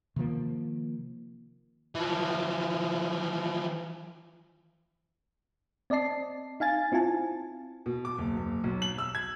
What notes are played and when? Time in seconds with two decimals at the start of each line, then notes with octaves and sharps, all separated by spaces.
0.16 C3 D#3 F3 A#3
1.95 E3 F3
5.90 C4 D5 D#5 A5 C7
6.60 D#4 F5 G#5 A6
6.92 C4 E4 F4 G#5 A5
7.86 B2
8.05 D6
8.18 F#1
8.37 F#1
8.64 B1
8.82 F#7
8.98 E6
9.15 G#6